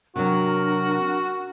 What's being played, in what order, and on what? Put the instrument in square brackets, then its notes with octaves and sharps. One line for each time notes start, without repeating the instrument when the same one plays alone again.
[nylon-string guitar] C3 F#3 [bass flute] D4 [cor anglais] F#4 [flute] A#4